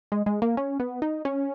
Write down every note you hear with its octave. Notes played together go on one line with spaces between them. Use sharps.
G#3
G#3
A#3
C#4
B3
D#4
C#4